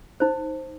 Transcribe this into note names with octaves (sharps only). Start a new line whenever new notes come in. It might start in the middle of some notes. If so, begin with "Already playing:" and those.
D#4 C5